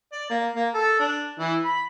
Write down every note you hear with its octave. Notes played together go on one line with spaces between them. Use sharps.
D5
A#3
A#3
A4
D4
E3
B5